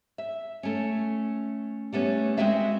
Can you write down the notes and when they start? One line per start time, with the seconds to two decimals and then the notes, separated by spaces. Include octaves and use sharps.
0.18 E5
0.63 A3 C#4
1.92 G3 A3 B3 C#4
2.37 G#3 C4 F#4 B4 E5 F5